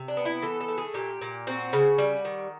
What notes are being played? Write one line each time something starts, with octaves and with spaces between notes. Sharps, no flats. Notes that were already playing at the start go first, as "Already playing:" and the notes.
Already playing: C3
D4
B3
E4
E3 A4
A4
A3
G#4
A#2 G4
A#2
C4 F#4
C#3
G3
D#3